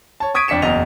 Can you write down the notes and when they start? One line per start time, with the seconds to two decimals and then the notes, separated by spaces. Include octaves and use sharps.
0.20 C#5 A5
0.35 C#6 D#6 G#6 B6 D7 D#7
0.48 F2 D4 B6 C#7 E7
0.62 F#1 E2 D#5 F7